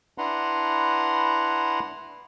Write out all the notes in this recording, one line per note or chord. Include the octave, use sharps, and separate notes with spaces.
D4 E4 B4 F#5 A#5 C6